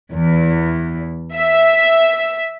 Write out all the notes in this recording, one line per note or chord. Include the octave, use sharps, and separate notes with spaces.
E2
E5